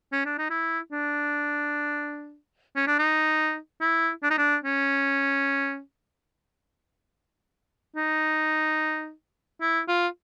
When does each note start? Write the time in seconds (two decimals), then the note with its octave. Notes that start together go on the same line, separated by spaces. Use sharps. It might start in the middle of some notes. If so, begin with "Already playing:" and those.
0.12 C#4
0.25 D4
0.38 D#4
0.50 E4
0.92 D4
2.76 C#4
2.87 D4
2.99 D#4
3.81 E4
4.23 D4
4.30 D#4
4.38 D4
4.64 C#4
7.96 D#4
9.61 E4
9.88 F4